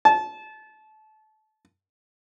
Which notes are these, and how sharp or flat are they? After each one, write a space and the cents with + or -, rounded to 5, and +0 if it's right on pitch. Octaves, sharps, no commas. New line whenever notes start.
A5 -25